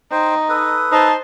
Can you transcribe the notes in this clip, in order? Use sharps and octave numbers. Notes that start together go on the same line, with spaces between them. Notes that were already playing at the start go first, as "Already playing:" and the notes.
D#4 C5 G5
A4 B4 D#6
D#4 C5 A5